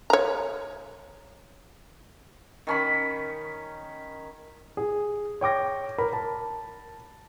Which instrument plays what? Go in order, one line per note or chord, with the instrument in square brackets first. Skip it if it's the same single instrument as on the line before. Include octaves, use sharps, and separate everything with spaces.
[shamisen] C#5 A#5
[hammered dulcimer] D#3 C#4 B5
[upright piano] G#4
C#5 G5 D6 A#6
A#4 B5
A5